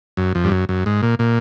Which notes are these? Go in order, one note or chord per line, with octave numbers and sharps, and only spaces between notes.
F#2
F2
G2
F#2
F#2
G#2
A#2
A#2